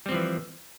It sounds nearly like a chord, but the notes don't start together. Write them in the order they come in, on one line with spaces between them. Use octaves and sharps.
G3 C4 F3 E3